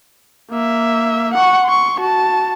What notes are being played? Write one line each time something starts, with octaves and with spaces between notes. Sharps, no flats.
A#3 E5
F#5 C#6
C6 C#6
F#4 A5